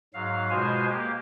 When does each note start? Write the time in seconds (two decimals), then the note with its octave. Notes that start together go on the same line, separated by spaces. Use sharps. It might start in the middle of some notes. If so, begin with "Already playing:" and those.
0.14 G#2 F#3 F5
0.50 B2 G#3 F4 C5 G#5
0.89 A#3 G4